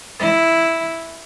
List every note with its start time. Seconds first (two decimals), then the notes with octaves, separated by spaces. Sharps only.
0.20 E4